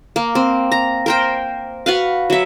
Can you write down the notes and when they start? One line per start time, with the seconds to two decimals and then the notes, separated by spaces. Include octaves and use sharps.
0.16 A#3
0.35 C4
0.72 A#5
1.06 A#4 C5 G5
1.86 F#4 B4 F5
2.30 F#3 E5